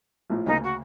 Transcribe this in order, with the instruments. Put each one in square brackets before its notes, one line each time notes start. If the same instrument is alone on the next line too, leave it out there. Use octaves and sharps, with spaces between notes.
[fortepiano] A#1 A2 F3
[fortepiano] D2 C#3 A#3 [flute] D#4
[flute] F#4